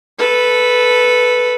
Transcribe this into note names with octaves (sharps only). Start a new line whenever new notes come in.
A4 B4